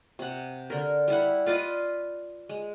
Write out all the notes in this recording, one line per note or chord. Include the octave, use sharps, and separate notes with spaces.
C3 F#5
D3 A#4
G3 E4 F#5
F4 B4 D5 D#5
G#3